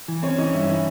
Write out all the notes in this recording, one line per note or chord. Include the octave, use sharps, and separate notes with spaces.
E3
C4 C#4 C#5
E3 D#4 D#5
G2 E4 E5
E3